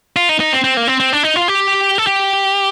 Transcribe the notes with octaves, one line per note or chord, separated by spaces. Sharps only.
F4
D#4
D#4
C4
C4
A#3
C4
C4
D4
D#4
F4
G4
A4
G4